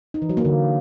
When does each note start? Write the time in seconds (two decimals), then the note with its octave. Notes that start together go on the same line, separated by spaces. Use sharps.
0.14 D#4
0.22 E3
0.29 F#3
0.37 A#3
0.45 D3